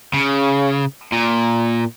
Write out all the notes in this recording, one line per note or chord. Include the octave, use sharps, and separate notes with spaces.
C#3
A#2